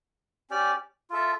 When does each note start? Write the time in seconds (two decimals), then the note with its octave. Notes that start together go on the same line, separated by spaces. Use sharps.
0.50 C#4 G4 D5
1.10 F4 A4 E5